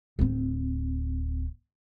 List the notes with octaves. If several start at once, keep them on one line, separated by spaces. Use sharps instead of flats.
D1 C4